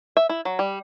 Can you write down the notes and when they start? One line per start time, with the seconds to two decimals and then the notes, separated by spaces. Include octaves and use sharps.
0.17 E5
0.29 E4
0.45 F#3
0.59 G3